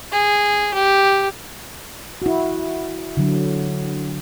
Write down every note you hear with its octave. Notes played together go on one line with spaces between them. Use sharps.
G#4
G4
E4 F#4
D3 F#3